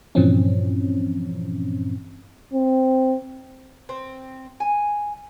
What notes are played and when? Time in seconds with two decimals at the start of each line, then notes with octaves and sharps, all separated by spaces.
0.15 G2 A#2 E3 F3 C4 C#4
2.53 C4
3.89 C4
4.60 G#5